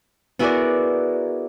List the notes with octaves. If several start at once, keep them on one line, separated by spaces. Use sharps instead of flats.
B3 E4 F#4 G#4 A#4 D5